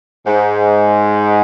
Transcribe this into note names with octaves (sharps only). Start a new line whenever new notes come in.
G#2